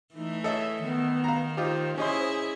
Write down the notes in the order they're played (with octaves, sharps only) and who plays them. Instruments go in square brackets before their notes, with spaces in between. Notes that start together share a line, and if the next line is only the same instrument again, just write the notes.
[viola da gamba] E3 A3 [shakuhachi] D#4
[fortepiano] A4 D#5 E5 [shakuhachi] C#5
[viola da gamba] D#3 [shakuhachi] B3
[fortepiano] F5 A#5
[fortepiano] D#4 F4 G4 [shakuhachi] C5
[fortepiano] C#4 D#5 C6 [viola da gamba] E4 G#4